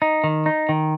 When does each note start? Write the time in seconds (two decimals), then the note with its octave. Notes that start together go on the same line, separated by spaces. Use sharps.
0.02 D#4
0.24 D#3
0.46 D#4
0.69 D#3